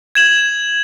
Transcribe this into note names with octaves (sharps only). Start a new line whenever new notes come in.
G#6 E7 F#7